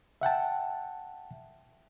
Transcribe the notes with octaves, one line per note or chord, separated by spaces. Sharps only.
E5 F#5 G5 A5